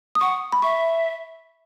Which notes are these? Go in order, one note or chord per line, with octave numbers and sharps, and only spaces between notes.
D#6
F#5 C#6
B5
E5 C#6